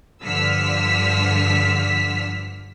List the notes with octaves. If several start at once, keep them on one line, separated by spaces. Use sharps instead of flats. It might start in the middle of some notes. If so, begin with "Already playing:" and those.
G2 D3 F3 E6 F6 B6